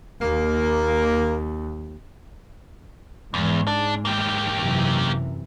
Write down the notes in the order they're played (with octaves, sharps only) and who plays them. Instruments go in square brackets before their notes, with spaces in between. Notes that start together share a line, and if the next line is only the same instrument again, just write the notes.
[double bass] D#2 [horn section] A#3
[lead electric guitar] E2 [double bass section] G#2
[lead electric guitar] D4
A#3 G4
[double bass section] F#2 C3 E3